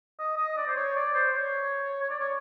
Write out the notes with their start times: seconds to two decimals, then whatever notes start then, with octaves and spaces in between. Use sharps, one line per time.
0.19 D#5
0.37 D#5
0.57 D5
0.68 C5
0.76 C#5
0.96 D5
1.14 C5
1.33 C#5
2.03 C#5
2.10 D5
2.19 C#5